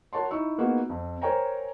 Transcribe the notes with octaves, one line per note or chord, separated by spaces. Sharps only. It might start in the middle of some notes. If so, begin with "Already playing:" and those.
F#4 A#4 C#5 A5 C6
D#4 E4 C#6 E6
A#3 B3 D#4 F4 F#4 G#4
F2
A#4 C5 C#5 G5 G#5 A#5